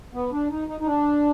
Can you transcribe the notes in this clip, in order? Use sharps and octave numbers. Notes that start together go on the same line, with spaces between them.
B3
D4
D#4
D#4
D#4
D4